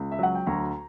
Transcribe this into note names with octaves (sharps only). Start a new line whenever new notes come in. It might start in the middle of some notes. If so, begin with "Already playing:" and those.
Already playing: C#2
E5
F#3 F#5
G5
D2 A#5